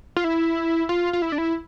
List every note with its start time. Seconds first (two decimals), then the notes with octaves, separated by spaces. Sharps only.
0.17 F4
0.24 E4
0.89 F4
1.13 F4
1.22 E4
1.32 D4
1.38 E4